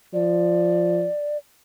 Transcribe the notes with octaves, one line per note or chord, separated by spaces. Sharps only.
F3 D5